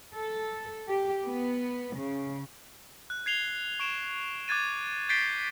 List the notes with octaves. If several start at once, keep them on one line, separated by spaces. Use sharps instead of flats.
A4
G4
B3
C#3
F#6
G#6 C7 F7 G7
C#6 D7 E7
D6 F#6 G#6 A6 D#7
G6 A6 B6 C7 D7 G7